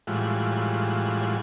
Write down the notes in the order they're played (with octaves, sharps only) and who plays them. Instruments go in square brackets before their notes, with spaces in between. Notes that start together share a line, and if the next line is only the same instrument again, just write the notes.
[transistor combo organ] A2 E3 G3 G#3 F4 F#4